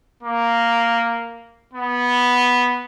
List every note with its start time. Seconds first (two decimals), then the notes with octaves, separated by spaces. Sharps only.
0.23 A#3
1.73 B3